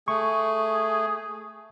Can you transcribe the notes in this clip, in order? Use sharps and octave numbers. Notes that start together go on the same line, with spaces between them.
A3 G#4 C#6